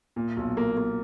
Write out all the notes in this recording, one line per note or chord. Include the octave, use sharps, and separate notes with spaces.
A#2
B1
A#3
A#3